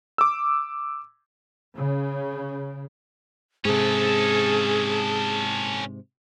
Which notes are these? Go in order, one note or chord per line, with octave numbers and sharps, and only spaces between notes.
D6 E6
C#3
G#2 C3 C#4 G#4 A4